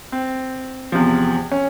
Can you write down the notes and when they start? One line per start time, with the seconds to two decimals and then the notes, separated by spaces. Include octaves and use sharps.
0.12 C4
0.92 E2 C3 F3
1.51 C#4